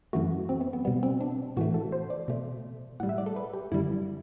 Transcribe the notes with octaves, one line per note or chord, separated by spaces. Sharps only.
F#2 E3 A3 F#4
C4
B3
B3
B2 G3 B3
C4
D4
A2 E3 A3 F#4
A4
C5
D5
B2 A3
A2 G3 F#5
E5
D5
A4
B4
G4
F#2 D3 G3 E4